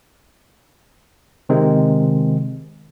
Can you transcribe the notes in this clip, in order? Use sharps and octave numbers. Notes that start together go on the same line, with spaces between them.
C3 D#3 G#3 C4